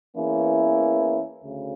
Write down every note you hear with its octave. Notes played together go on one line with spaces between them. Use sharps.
E2 E3 A#3 C#4 E4
D2 C#3